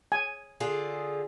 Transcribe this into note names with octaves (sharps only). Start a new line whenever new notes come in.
G#5
D3 F4 G#4